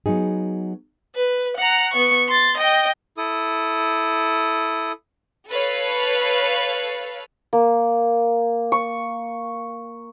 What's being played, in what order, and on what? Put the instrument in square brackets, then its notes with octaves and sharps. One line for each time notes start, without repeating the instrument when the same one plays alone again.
[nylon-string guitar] F#3 B3 D#4 G#4
[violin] B4
F#5 A#5
B3 C#6
C6 A6
D#5 G5
[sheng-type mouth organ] E4 A4 D#6
[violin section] A4 B4 C#5 F5
[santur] A#3
C#6